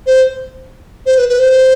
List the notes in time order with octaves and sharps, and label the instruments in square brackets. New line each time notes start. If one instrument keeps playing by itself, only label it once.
[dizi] C5
C5
B4
B4
C5